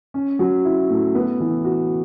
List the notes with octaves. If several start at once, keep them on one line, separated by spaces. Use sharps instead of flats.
C#4
F#3
E4
A2
B3
E3
F#4